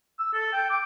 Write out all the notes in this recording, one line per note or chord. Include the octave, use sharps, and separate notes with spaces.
E6
A4
G5
D6